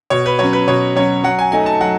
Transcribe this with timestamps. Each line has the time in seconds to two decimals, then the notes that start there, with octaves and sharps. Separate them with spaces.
0.10 B2 C#5
0.26 B4
0.39 F#3 C#4 C#5
0.53 B4
0.68 B2 C#5
0.96 F#3 C#4 C#5
1.24 F#3 F#5
1.39 G#5
1.52 A3 D#4 G#5
1.66 A5
1.81 F#3 F#5